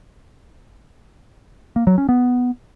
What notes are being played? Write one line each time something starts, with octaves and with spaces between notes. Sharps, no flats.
A#3
F#3
C#4
B3